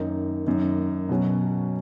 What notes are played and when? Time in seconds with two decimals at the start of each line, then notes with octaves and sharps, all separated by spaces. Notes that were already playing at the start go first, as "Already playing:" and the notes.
Already playing: F#2 D#3 A#3 D#4
0.46 F#2 D#3 A#3 D#4
1.09 B2 F#3 C#4